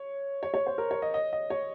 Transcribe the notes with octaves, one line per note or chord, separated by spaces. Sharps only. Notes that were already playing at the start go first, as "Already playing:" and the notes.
Already playing: C#5
C#5
C#5
C5
A#4
C#5
D#5
D#5
D#5
C#5